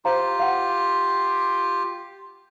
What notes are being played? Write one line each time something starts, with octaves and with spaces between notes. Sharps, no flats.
F4 G4 C5 F5 A#5
F5 F#5